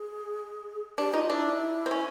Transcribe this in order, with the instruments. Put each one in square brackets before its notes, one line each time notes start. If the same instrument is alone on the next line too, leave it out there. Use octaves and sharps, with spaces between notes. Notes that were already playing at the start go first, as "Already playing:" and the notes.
Already playing: [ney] G#4
[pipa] D4 [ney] G4
[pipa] D#4 [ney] F4
[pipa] D4 [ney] E4
[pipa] C4
C#4